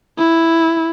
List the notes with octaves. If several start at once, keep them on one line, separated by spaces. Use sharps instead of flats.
E4